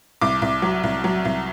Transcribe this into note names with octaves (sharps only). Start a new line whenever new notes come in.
C2 D6
C2
F#3
C2
F#3
C2